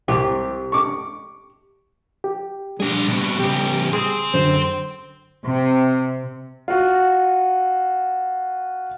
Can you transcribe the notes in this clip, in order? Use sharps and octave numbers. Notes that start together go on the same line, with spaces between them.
C2 G4
C#6 D6
G4
G3 D4 G#4
C3 B3
C#3 B3 G4
G#4 G5 C6
F#2 D3 C5
C3
F4 F#4